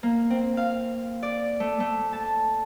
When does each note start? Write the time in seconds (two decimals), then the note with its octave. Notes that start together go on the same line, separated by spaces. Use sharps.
0.03 A#3
0.30 C4
0.57 F5
1.23 D5
1.60 A3
1.80 A3
2.13 A5